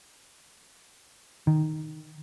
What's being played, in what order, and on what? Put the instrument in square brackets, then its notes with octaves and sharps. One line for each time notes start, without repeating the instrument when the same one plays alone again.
[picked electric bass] D#3